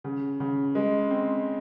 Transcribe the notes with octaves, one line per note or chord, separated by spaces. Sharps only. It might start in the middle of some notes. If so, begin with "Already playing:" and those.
C#3
C#3
G#3
C4